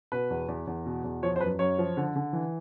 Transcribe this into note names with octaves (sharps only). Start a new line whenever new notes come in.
B2 B4
E2
E2
E2
B2
E2
F3 C#5
C5
F#2 B4
F#2 C#5
F3
D3
D3
E3